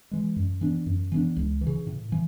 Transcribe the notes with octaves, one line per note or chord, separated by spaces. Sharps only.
E3 G#3
F#2
E3 B3 D4
F#2
E3 B3 D4
C#2
E3
C#3
A2
E3